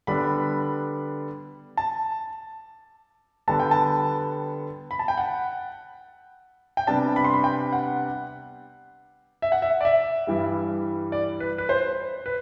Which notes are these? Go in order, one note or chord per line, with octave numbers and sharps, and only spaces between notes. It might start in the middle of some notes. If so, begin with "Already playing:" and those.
D3 G3 B3 D4 B5
A5
D3 G3 B3 A5
G5
A5
B5
A5
G5
F#5
G5
C3 G3 B3 D4 A5
B5
C6
B5
G5
F#5
E5
F#5
E5
D5
E5
G2 E3 G3
D5
B4
B4
C5
B4